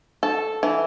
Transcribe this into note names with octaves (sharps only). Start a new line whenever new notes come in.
A4
E3